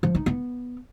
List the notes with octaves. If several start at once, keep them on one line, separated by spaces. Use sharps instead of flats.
F3
D#4
B3